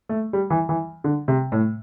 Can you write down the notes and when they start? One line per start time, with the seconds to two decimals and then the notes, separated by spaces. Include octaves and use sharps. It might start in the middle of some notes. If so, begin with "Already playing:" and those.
0.09 A3
0.33 G3
0.50 E3
0.69 E3
1.04 D3
1.28 C3
1.52 A2